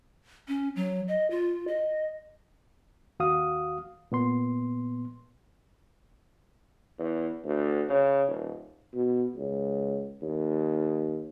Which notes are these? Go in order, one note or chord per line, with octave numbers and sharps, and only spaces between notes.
C#4
F#3
D#5
F4
D#5
D#2 F#4 F5 D#6
A#2 B3 C6
E2
D2
C#3
D#1
B2
C#2
D#2